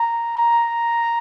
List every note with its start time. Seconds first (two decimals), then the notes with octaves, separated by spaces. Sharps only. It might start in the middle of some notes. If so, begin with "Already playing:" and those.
Already playing: A#5
0.37 A#5